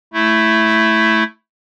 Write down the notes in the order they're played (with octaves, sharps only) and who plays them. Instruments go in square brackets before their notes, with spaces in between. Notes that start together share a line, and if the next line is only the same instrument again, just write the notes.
[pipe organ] A3 E4